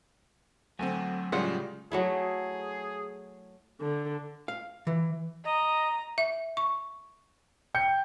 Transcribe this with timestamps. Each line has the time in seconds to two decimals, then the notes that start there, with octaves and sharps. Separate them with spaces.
0.79 D2 F#3 A3 C4 G#5
1.32 A2 C#3 G3 G#3 F4 F#5
1.92 F#3 A3 E4 G#4
3.81 D3
4.48 F5
4.87 E3
5.45 D#5 A#5
6.18 E5
6.57 C#6
7.74 G5 G6 C#7